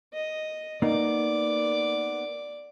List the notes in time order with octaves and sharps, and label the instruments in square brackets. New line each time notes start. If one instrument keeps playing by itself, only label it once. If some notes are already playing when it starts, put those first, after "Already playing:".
[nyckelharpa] D#5
[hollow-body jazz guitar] A#3 B3 D#4 [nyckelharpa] D5 D6